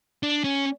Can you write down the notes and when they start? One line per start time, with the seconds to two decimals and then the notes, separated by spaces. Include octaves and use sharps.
0.23 D4
0.44 C#4